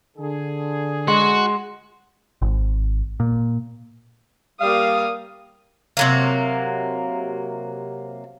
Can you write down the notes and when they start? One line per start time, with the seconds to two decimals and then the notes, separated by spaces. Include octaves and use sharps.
0.17 D3 G#4
1.08 G#3 F#4 C6
2.42 G#1
3.20 A#2
4.61 G3 A#3 F5 D#6
5.97 C3 F#3 A#3